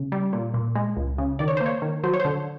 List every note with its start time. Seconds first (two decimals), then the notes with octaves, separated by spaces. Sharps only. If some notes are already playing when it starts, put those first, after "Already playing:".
Already playing: C#3
0.12 G3
0.33 A#2
0.54 A#2
0.76 G#3
0.97 C#2
1.18 C#3
1.39 D#3 D5
1.48 C#5
1.57 C5
1.61 A#3
1.66 C#5
1.82 D#3
2.04 F#3 C5
2.14 C#5
2.20 C5
2.25 D3